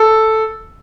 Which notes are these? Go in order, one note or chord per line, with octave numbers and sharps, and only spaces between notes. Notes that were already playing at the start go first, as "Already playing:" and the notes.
Already playing: A4